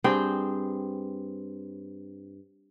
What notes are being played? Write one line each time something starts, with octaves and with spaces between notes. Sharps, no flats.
G2 C4 G#4 G5